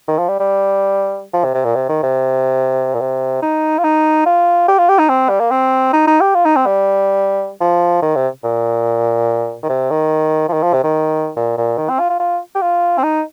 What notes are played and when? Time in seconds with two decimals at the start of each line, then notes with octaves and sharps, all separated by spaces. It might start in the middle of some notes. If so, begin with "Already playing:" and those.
0.08 D#3
0.18 F3
0.28 G3
0.40 G3
1.33 F3
1.44 C3
1.54 C3
1.64 A#2
1.75 C3
1.89 D#3
2.03 C3
2.94 A#2
3.00 C3
3.42 D#4
3.78 F4
3.84 D#4
4.26 F4
4.68 G4
4.78 F4
4.89 G4
4.99 D#4
5.09 C4
5.29 G3
5.40 A#3
5.51 C4
5.93 D#4
6.07 D#4
6.21 G4
6.35 F4
6.45 D#4
6.56 C4
6.66 G3
7.61 F3
8.02 D#3
8.15 C3
8.44 A#2
9.63 D#3
9.69 C3
9.90 D#3
10.48 F3
10.53 D#3
10.63 F3
10.73 C3
10.84 D#3
11.36 A#2
11.57 A#2
11.78 D#3
11.89 C4
12.00 F4
12.10 F4
12.20 F4
12.55 G4
12.61 F4
12.98 C4
13.03 D#4